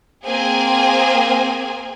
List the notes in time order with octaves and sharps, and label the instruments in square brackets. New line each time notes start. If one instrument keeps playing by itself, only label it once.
[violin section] A#3 C4 G#4 G#5